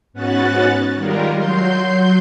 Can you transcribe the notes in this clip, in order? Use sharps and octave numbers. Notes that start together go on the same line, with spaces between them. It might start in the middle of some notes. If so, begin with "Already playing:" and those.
G#2 B3 C#4 F#4 F#6 A6
D#3 G3 G#3 F4 A#4
F#3 C6 G6